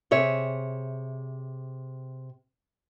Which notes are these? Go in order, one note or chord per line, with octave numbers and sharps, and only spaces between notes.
C3 G#4 C#5 E5